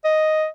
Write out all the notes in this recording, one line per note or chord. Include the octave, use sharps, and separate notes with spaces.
D#5